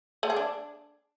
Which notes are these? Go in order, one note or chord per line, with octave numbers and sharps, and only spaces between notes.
A3
G#4
D4